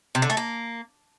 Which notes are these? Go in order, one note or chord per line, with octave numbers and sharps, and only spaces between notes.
C3
D3
A3
A#3